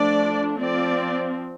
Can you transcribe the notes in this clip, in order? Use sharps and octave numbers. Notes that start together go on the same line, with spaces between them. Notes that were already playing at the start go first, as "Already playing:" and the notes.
Already playing: F3 A3 D4 D5
F3 C4 D5